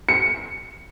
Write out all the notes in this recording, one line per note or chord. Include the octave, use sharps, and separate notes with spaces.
C#7